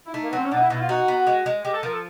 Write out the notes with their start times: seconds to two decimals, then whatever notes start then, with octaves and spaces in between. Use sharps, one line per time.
0.06 E4
0.13 A3 D#4
0.22 A#3
0.29 B3
0.33 F#3 C4
0.45 C#4
0.51 B2 D4
0.57 D#4
0.61 E4
0.70 B2 D#4
0.75 E4
0.80 F4
0.89 D#4 F#4
1.08 B3
1.27 G#3
1.46 G#3
1.64 G#3 G4
1.74 A4
1.83 F3 A#4
1.93 A4